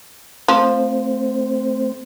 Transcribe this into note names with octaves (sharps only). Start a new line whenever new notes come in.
F3 A3 C4 C5